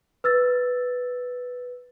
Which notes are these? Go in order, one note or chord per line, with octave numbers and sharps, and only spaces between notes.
B4 E6 A6